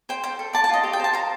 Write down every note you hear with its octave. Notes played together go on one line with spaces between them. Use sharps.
C5 G5
C5 G5
A4
D5 A5
A5
F4 D#5
G4
G5
C5 A5
C5 A#5